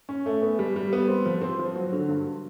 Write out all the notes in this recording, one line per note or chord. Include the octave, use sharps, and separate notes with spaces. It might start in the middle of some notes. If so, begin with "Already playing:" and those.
C#4
A3
B3
G3
G3
B3
C4
F3
C4
F3
F#3
D3
G2